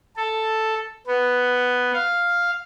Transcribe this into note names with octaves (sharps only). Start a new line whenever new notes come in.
A4
B3
F5